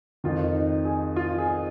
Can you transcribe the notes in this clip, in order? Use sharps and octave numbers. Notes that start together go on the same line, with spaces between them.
F2 D#3 F4
D#4
G#4
F4
G#4